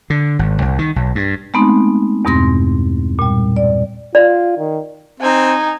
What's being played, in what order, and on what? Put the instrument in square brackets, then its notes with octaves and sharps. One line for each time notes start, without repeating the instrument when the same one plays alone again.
[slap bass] D3
G#1
C2
D#3
B1
G2
[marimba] G#3 A3 B3 C4 D#4
E2 G2 B2 C4 C6 A#6
A#2 G3
D5
[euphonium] F4 [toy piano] D5
[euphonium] D#3
[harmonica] C4 [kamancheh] D#4 G#5